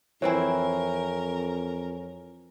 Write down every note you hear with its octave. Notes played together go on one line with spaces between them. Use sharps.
F2 E3 C4 E4 A#4 C#5 G#5